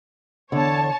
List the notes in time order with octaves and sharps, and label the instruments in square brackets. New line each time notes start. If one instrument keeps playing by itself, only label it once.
[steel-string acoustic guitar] E2 D3 [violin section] C#5 A5